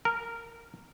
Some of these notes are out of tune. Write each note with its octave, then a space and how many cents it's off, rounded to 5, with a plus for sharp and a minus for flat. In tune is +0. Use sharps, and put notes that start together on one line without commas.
A#4 -10